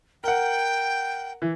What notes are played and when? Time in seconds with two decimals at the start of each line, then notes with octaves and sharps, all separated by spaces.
0.24 A#4 F#5 G5
1.42 E3